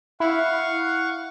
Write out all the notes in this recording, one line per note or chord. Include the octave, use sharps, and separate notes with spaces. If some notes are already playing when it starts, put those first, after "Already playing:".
E4 F5 F#5 C#6